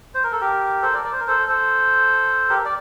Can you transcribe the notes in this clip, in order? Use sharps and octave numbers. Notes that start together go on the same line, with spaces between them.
C5
A#4
A4
G4 A#4
A4 C5
A#4 D5
D5
C5
A#4
A4 C5
A4 C5
G4 A#4
D5